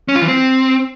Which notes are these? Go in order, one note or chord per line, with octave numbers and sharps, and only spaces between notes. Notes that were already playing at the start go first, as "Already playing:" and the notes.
C#4
F4
E3
C4